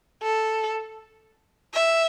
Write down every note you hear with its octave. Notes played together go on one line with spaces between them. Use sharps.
A4
E5